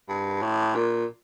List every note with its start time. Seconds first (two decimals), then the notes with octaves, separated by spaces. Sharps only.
0.09 G2
0.42 A2
0.75 A#2